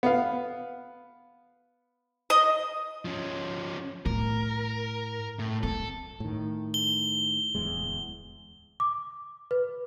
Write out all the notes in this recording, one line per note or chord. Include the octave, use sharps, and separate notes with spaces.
B3 F5
D#5
F3 C#4
A2 A#4
A2
C4 A4
A2 D#3
G7
D1 E2 G#3
D6
B4